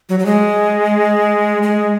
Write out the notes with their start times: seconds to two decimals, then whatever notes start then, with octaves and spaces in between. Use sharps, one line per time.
0.09 F#3
0.19 F#3
0.26 G#3
1.63 G#3